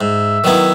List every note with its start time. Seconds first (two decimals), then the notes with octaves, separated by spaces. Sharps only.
0.01 G#2 E5
0.44 D#3 F#3 B3 E4